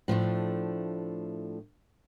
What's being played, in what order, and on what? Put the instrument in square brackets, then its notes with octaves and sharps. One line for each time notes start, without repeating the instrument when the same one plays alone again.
[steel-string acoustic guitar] A2 F3 A3 D4